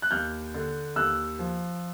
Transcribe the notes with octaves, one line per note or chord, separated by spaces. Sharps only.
F#6
D#2 F6 G6
D3
D#2 E6 F#6
F3